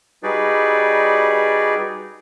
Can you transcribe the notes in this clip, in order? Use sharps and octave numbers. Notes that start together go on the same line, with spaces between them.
G3 D#4 F#4 G#4 B4 D5